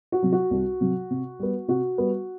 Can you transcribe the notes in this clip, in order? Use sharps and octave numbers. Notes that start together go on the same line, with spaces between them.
F#4
C3 F#3
F#4
C2
C3 F#3
C3
G3 B3
C3 F#4
G3 B3